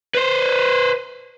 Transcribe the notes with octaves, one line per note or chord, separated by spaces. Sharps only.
B4 C5